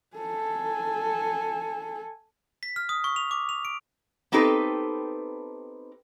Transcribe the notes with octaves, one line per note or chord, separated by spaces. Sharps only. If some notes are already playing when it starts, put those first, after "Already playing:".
A4 G#5
B6
F6
D#6
C#6
F7
D6
F7
D7
B3 C4 D#4 G4 A4 B4